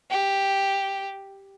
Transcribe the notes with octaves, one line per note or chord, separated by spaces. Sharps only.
G4